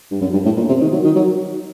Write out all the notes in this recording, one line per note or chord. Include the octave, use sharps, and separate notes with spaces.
G2
F#2
G2
A2
A#2
C3
D#3
F#3
D#3
F#3